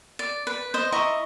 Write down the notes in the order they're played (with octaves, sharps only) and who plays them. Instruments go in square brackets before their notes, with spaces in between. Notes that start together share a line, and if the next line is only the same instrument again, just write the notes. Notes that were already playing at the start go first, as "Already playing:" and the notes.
[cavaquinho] D5
B4
C5 D#5
E4 D#5 A#5 C#6